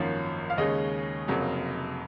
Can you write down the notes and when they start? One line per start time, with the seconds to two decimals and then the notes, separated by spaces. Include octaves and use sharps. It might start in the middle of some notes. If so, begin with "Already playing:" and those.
Already playing: G#1 F#2 F3 A#3 C#4
0.50 F5
0.58 D#2 C#3 G#3 C#4 D#5
1.28 F1 F2 C#3 F#3 A#3